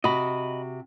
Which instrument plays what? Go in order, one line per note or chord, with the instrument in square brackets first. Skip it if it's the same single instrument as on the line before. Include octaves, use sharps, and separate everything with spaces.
[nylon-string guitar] C3 F#4 [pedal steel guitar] D#5 B5